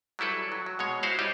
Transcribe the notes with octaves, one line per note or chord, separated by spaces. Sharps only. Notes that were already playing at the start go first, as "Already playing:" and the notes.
F#3 G3 E4 A4 B4
F#3
F#3
B2 G#3 C#5
E4 F#4 C5 F5 F#5
G3 D#4 G4 C5 C#5 D#5